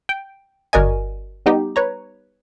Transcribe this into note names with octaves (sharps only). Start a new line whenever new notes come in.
G5
G1 F#4 A#4 D5 D#5 G#5
G3 B3 D#4 G4
B4 C#5 A#5